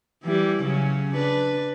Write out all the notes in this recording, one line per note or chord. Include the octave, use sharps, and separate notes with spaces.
E3 G3 E4
C#3 F#3 C#4
D4 B4